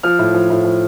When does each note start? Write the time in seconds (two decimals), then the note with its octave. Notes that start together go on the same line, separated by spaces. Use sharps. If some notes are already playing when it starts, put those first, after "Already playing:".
0.03 F3 F6
0.19 A2
0.34 F3
0.50 A2
0.65 F3